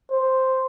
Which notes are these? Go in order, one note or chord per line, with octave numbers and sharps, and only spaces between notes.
C5